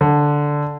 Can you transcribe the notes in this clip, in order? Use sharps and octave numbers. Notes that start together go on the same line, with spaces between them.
D3